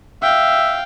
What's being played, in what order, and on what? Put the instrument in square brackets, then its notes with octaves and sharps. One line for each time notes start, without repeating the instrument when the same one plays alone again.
[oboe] E5 [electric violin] F5 G5